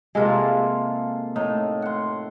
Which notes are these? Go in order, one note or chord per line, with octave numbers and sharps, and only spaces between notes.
C3 G#3 A#3 F4 A4
A2 D#4
F#5 C6